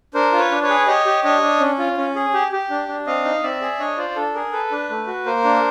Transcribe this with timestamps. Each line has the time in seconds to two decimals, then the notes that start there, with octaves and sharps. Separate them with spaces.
0.14 D4 A#4 C5
0.32 F4
0.39 B4 C#5
0.51 D4
0.63 B4 C#5
0.69 G#4
0.87 G4 C#5 D#5
1.06 G4
1.24 D4 C#5 D#5
1.42 D4
1.61 C#4
1.79 F4
1.97 C#4
2.15 G#4
2.33 G4
2.52 G4
2.70 D4
2.88 D4
3.07 C4 D#5 F5
3.25 D#4
3.43 C4 D5 E5
3.61 G#4
3.79 D4 C#5 D#5
3.98 F4 C5 D5
4.16 D4 A4
4.34 G#4 A#4
4.52 A4 B4
4.71 D4
4.90 A3
5.07 F#4
5.26 A#3 A#4 C5
5.44 D4